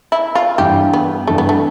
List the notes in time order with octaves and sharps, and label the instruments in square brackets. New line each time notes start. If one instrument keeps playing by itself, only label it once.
[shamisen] E4
F4
[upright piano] G2 E3 G3 [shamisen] G4
[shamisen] B3
[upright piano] G2 E3 G3 [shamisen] A3
[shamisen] B3
A3